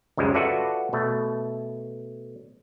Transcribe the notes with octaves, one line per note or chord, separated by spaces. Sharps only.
C#2 F#2 F3 G3 G#3
F4 F#4 A4 B4 D5 E5
B2 A3